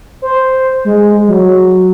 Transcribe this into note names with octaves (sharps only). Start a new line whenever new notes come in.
C5
G#3
F#3